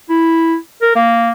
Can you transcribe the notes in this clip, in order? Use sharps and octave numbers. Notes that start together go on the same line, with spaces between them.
E4
A#4
A#3